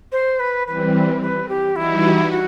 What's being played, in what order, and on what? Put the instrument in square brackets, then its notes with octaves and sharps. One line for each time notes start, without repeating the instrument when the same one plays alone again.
[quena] C5
B4
[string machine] E3 G3 C4 [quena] B4
[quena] B4
G4
[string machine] E3 G3 D#4 F#4 [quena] E4
[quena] F#4